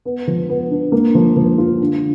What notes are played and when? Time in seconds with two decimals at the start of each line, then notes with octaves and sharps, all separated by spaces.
0.05 B3
0.27 F3
0.49 B3
0.71 D4
0.92 A#3
1.15 F3
1.36 F3
1.58 F4
1.81 D3